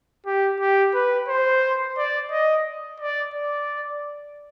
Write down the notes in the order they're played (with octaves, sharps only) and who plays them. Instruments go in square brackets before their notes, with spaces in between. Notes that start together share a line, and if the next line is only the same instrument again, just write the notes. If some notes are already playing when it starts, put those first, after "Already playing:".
[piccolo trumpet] G4
G4
B4
C5
D5
D#5
D5
D5